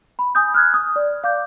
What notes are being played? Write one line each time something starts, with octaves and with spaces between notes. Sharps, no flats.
B5
G#5 D#6 G6
F6 F#6 G#6
D#6
D5
F5 D6 G6